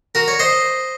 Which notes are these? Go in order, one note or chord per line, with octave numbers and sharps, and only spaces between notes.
F#4 A#4
C#5
C5 D#5